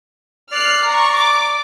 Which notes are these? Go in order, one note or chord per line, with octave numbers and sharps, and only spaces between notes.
D5 F6 F#6 C7
A#5 C#6
D6